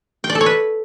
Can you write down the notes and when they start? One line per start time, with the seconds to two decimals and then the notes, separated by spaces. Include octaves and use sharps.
0.24 G5
0.30 D5
0.35 A4
0.41 C#5
0.46 B4